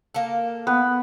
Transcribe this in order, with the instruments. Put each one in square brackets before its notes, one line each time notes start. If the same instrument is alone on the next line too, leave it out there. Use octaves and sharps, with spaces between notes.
[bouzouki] A#3 A4
[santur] B3